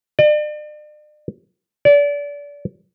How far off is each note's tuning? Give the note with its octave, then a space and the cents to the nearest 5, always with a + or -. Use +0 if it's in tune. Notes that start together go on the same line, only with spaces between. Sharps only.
D5 +40
D5 -30